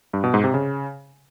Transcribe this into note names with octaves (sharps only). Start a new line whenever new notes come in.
G2
B2
G#2
C3
C#3